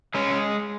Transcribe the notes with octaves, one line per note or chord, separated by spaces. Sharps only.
G#3 C#4